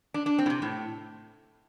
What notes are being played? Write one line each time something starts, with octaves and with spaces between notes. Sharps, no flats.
D4
D4
C4
A2
C3
A2